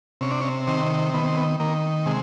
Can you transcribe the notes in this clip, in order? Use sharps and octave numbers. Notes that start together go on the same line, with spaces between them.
C3 C#4
D4
C#4
D#3 C4
D#3 B3
C4
B3
D#3 A#3
C3 G#3